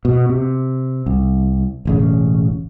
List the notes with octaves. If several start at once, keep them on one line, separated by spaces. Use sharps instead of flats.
B2
C3
C2
E1 A1 C#3